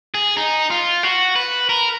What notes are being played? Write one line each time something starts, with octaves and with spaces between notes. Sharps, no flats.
G#4
D#4
F4
F#4
B4
A#4